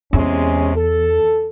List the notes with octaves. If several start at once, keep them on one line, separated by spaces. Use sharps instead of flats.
E2 C3 G#3 C#4
A4